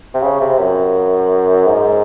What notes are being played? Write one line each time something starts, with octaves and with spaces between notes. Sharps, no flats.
C3
C#3
C3
F#2
G#2